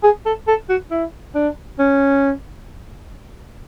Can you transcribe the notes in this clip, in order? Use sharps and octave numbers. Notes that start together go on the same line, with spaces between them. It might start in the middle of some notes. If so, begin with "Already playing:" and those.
G#4
A4
A4
F#4
E4
D4
C#4